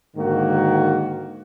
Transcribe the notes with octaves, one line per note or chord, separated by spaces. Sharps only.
G#2 D3 D#3 A#3 F#4